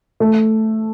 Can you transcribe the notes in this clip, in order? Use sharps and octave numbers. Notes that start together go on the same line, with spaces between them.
A3